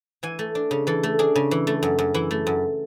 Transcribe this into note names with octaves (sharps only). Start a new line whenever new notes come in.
E3 G#5
A3
D4
C#3
E3 A4
A3
D4 G#4
C#3
E3
A3
F#2
F#2
E3 E4
A3
F#2